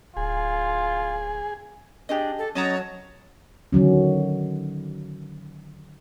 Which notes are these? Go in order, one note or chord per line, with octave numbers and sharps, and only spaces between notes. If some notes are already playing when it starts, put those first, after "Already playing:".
D1 F4 G#4
D4 G4 G#4 D#5
A4
F#3 C#4 C#5 D#5 A5 A#5
D3 D#3 F#3 C#4